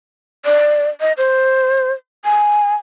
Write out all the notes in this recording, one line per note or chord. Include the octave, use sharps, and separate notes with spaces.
D5
D#5
C5
G#5